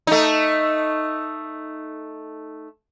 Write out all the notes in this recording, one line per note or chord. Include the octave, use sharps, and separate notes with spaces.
A3 D#4